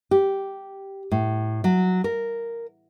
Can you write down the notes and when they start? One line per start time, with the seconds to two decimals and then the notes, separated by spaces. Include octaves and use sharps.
0.11 G4
1.11 A2
1.64 F#3
2.04 A#4